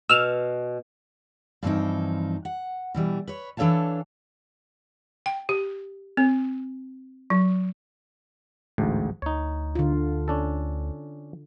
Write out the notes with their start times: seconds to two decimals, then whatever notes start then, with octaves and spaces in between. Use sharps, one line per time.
0.09 B2 E6 F6
1.63 G2 E3 F3 A#3 C4 D#4
2.45 F#5
2.94 B2 E3 G3
3.28 B4 C#5
3.57 E3 D4 A4 C#5 F5 A5
5.26 G5
5.49 G4
6.17 C4
7.30 F#3
8.78 A1 D2 G#2
9.22 D2 D#4 C#5
9.75 D3 F4
10.28 C#4 D4 A4